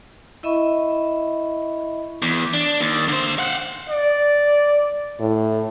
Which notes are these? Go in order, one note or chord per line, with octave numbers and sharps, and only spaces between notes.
E4 D#5 E5 B5 C#6
E2
D4
D#2
D3 C5
F5 F#5
D5
A2